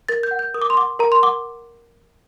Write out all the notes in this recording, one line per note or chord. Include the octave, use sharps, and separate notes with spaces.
A#4 A6
G6
F#5
G6
A#4 D#6
D6
C6
F#5 D6
A#4 A#5
C6
F#5 D6